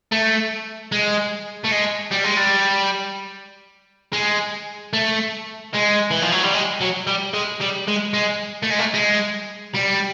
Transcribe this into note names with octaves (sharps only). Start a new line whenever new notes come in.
A3
G#3
A3
G#3
G3
G#3
G3
G#3
A3
G#3
E3
F3
F#3
G3
G#3
F#3
G3
G#3
G3
G#3
G#3
A3
G#3
A3
G#3
G3